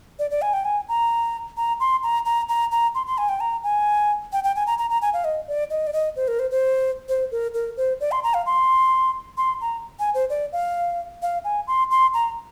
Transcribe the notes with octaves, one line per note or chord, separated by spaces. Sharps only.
D5
D5
G#5
G5
G#5
A#5
A#5
C6
A#5
A#5
A#5
A#5
C6
C6
G#5
G5
A#5
G#5
G5
G5
G#5
A#5
A#5
A#5
G#5
F5
D#5
D5
D#5
D5
D#5
C5
A#4
C5
C5
C5
A#4
A#4
C5
D5
C6
A#5
F5
C6
C6
A#5
G#5
C5
D5
F5
F5
G#5
C6
C6
A#5